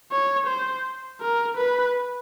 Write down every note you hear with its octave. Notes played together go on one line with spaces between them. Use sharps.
C#5
C5
A#4
B4